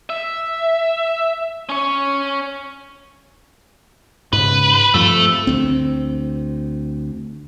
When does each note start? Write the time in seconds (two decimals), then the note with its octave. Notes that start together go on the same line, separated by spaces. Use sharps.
0.10 E5
1.69 C#4 C#5
4.33 G#2 C#3 B4
4.94 G2 F3 A3 C4
5.47 D2 C4